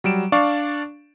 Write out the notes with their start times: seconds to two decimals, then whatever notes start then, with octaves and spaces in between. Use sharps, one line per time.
0.04 F#3 G3 D7 E7
0.32 D4 D5 F5 C#6